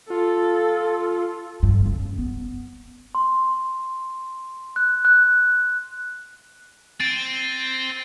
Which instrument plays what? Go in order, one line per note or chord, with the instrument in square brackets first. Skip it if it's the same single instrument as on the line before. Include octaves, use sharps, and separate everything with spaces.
[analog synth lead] F4 [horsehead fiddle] A4
[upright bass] G2
C#3
B3
[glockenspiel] C6
F#6
F#6
[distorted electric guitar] C4 [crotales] A6 D7 D#7